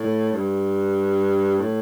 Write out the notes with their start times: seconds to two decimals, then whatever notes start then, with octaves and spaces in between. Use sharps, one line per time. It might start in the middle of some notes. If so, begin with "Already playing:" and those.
Already playing: A2
0.33 G2
1.58 A2